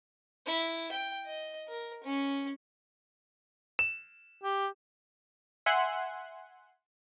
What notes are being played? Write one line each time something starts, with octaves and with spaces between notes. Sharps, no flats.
E4
G5
D#5
A#4
C#4
E7
G4
E5 F#5 G#5 C6 F#6